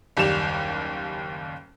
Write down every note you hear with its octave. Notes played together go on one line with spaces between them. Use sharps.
F#1 D#2 G3 G4 E7 F7